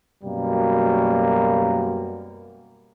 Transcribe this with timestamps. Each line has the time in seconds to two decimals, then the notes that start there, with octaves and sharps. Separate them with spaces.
0.24 F#2 B2 G3 A#3